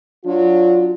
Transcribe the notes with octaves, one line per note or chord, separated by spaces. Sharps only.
F#3 D4 F4